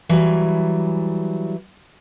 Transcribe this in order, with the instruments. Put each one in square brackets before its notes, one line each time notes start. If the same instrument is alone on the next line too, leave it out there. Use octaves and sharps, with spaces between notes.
[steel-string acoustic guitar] E3 F#3 G3